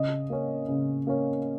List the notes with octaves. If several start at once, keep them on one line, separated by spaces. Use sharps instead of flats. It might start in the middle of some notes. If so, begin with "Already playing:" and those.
Already playing: C#3 D#5
A#3 C#4
C#3
A#3 C#4